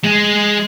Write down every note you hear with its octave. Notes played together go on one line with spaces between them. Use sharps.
G#3